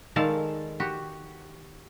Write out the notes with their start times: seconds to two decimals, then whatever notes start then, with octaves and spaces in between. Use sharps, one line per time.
0.16 D#3 G#3 A4 D5 F5 A5
0.80 F#4 G4